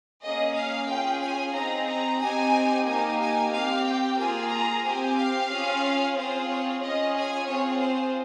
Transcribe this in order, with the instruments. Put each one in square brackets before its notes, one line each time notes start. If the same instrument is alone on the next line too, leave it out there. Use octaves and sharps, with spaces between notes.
[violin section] A#3 C#4 G#4 D#5
F5
C#4 F4 G#4 G5
G#5
C4 D#4 G#4 A#5
A#5
C4 D#4 G4 G#5
A#3 D#4 G4 G#5
G#5
C4 G4 F5
G5
A#3 F4 G#4 G#5
A#5
C4 G4 G#5
F5
C#4 F4 G#4
C4 F4 G#4 C5
C#5
C#4 F4 G#4 D#5
G#5
C4 F4 G#4 C#5
C5